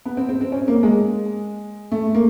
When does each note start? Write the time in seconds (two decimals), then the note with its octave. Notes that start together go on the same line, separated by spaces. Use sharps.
0.05 B3
0.17 C4
0.29 C4
0.41 C4
0.52 C#4
0.68 A#3
0.83 G#3
1.92 A3
2.15 A#3